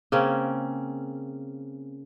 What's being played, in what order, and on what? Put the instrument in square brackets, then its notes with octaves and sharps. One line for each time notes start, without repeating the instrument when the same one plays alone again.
[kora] C#3 A#3 C4 C#4